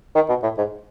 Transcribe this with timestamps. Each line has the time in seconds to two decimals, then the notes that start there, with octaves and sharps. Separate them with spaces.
0.15 D#3
0.29 B2
0.43 A2
0.58 G#2